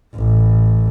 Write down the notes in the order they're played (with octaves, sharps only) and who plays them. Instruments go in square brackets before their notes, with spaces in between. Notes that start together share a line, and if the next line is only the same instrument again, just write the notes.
[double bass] A1